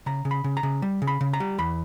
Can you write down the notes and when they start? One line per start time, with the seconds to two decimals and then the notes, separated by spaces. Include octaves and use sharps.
0.06 C#3 A#5
0.25 C#3
0.31 B5
0.44 C#3
0.57 A#5
0.63 C#3
0.82 G3
1.02 C#3
1.07 B5
1.21 C#3
1.33 A#5
1.40 G3
1.58 E2 B5